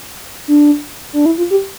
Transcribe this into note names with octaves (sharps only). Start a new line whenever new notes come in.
D4
D4
E4
F4
G4